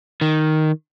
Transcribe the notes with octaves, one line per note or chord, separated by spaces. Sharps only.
D#3